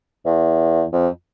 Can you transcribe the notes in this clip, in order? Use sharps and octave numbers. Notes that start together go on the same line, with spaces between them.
E2
F2